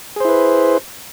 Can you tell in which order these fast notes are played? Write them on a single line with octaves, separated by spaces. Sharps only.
G#4 C5 E4 B4